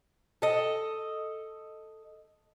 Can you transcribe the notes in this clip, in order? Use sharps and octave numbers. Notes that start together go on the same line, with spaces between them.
A4 D#5